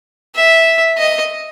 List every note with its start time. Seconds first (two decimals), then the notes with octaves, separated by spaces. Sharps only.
0.35 E5
0.98 D#5